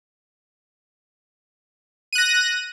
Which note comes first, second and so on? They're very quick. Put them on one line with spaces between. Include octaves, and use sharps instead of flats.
D#7 F#6 A#6